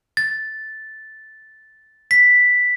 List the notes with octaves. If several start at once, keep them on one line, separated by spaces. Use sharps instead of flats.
A6
B6